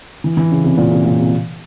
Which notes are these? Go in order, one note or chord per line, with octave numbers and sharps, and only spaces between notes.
E3
E3
C#3
C3
A#2
C3
A#2
C3